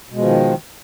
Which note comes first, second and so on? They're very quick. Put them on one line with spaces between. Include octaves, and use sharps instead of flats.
B2 G#3 F3 D#3